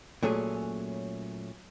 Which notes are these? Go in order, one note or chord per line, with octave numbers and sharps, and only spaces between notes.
A#2 F#3 A3 C#4 G#4